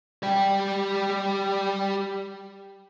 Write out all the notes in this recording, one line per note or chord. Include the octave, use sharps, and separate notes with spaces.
G3 G4